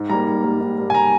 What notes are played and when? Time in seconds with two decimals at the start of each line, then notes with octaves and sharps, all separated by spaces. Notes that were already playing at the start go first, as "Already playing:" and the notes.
Already playing: G#2
0.10 G3 A#3 A#5
0.27 G#2
0.44 G3 A#3
0.61 G#2
0.78 G3 A#3
0.90 G#5
0.95 A#5